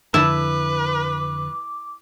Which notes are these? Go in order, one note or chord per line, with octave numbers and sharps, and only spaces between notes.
F2 D3 E4 B4 E5 A5 D6